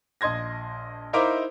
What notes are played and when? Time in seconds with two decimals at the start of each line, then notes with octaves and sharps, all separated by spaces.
0.21 A#1 D#5 C6 G#6 A#6
1.13 D#4 E4 A#4 C5 F5 D6